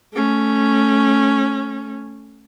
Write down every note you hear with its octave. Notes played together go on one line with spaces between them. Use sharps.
A3 C#4